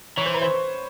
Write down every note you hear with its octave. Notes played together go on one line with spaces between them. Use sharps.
E3 C#5
C5
B4
C5